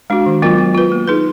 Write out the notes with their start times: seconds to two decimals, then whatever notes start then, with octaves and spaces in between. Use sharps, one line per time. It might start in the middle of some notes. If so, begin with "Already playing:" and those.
0.10 G#3 D4 F#4
0.26 D#3
0.42 F#3 B3 F4 A#4
0.58 B3
0.74 F4 B4
0.92 A#3
1.07 D#4 G#4 B4